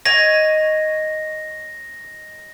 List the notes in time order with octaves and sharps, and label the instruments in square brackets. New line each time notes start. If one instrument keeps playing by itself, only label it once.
[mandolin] C#5 D#5 G#5 [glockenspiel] A#6